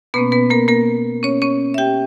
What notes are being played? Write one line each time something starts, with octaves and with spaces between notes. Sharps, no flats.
B2 A#3 B3 C#4 B4
B3 B4
A#3 A#4
A#3 A#4
C#4 C#5
C#4 C#5
E5
G4 G5